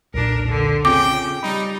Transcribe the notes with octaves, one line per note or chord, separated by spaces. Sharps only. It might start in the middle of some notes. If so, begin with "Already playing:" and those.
B1 E2 A#2 D4 A#4
D3
C#3 C4 F4 G5 D6
G3 D#4 B5